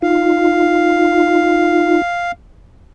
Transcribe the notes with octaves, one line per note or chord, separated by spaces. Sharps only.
D#4 F4 F5